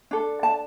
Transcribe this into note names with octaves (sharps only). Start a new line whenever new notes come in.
D4 A4
A5